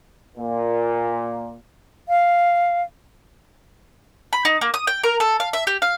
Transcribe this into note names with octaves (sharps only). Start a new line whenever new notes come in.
A#2
F5
B5
D#4
A#3
D#6
G5
A#4
A4
F5
E5
G4
F5